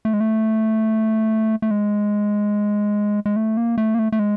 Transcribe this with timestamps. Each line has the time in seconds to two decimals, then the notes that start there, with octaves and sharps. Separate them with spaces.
0.05 A3
0.13 G#3
0.20 A3
1.62 A3
1.71 G#3
3.26 G#3
3.36 A3
3.57 A#3
3.78 A3
3.95 A#3
3.99 A3
4.12 A3
4.19 G#3